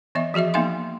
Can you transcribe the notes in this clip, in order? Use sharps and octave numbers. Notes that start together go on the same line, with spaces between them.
E3 B3 D#5 E5
F3 F#4 G#4 D#5 E5
A#3 B3 D#4 E5 F5 C6